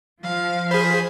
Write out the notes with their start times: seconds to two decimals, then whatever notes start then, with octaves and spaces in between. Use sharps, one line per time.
0.23 F3 F5
0.71 G#4 C5 B5